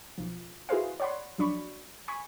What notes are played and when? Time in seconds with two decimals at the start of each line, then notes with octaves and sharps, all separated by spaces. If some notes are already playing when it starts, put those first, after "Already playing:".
0.18 B1 F3
0.69 E4 F#4 G#4 B4 C5 F5
1.00 C#5 D5 F#5 B5 C6
1.38 A#1 F#3 D4 D5 B5 C#6
2.08 G#5 B5 C#6